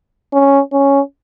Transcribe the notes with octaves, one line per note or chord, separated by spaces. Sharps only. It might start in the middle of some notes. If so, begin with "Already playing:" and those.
C#4
C#4